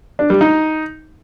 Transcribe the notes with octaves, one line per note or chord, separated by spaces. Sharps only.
D4
G3
D#4